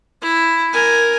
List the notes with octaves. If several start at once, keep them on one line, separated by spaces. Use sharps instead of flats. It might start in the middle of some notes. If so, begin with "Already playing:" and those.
E4
A#4 G#5